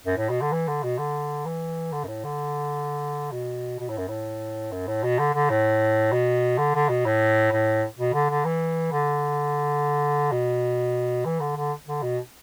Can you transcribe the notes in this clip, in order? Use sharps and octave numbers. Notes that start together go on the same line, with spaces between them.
F#2
A2
B2
D3
E3
D3
B2
D3
E3
D3
F#2
A2
D3
B2
B2
A2
F#2
A2
F#2
A2
B2
D3
D3
A2
B2
D3
D3
B2
A2
A2
B2
D3
D3
E3
D3
B2
E3
D3
D3
D3
B2